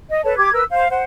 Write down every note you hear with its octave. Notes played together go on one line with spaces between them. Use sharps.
D#5
A4 B4 C#5 A5
G4 D6 G#6
A#4 B4 E6
C5 F5
C5 F#5